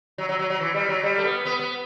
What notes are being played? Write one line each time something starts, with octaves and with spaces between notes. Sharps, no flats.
F#3
F#3
F#3
F#3
E3
G3
F#3
G3
A3
B3
B3
B3